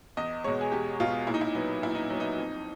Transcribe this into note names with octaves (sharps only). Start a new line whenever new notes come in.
E2 D#5
B2 G#3 C#5
G#4
E2 G4
B2 G#3 F4
A#2 E4
D#4
E4
F#3 B3
A#2 E4
D#4
F#3 B3
D#4
F2